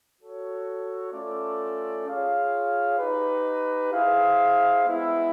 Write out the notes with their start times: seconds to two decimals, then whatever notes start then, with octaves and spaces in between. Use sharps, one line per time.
0.19 F#4 A4 C#5
1.11 A3 C#4 F4 A4 D5
2.05 F4 G#4 C#5 F5
2.98 D#4 G4 B4
3.92 E4 G#4 C5 F5
4.85 G#3 B3 E4